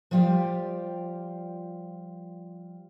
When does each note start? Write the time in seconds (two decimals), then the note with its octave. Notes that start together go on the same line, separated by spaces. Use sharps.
0.11 F3 G3 F4 G4 D5